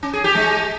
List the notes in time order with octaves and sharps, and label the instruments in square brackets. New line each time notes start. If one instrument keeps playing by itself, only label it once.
[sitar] C#4
G#4
G4
G#3